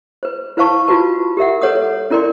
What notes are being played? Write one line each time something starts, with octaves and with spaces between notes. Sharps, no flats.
B4 C5
E4 B4 C5 F5 A5 C#6
F4 F#4 B4 A5
G4 A#4 E5 F#5
A4 B4 C#5 F#5 D#6
C#4 E4 A#4 D5 G5 C6